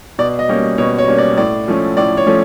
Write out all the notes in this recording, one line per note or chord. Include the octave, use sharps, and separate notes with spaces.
B2 D5
D#5
G3 A#3 C#4
B2 C#5
C#5
G3 A#3 C#4
D5
A2 D5
F3 A3 C#4
A2 D5
C#5
F3 A3 C#4